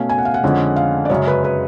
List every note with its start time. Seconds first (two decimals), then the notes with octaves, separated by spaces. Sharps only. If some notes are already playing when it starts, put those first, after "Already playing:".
Already playing: B2 A3 C#4 F5
0.09 G#5
0.18 F#5
0.25 F5
0.34 F#5
0.43 F2 D3 G#3 C#4
0.76 F5
1.05 D5
1.10 F#2 C#3 G#3 C#5
1.27 B4
1.44 B4